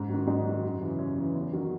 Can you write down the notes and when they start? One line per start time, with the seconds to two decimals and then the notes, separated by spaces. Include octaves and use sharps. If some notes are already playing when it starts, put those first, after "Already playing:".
Already playing: G#2
0.09 D#3 F#3
0.27 G#2 D#4
0.45 D#3 F#3
0.63 F#2
0.81 C#3 E3
0.98 F#2 C#4
1.17 C#3 E3
1.34 E2
1.53 D#3 F#3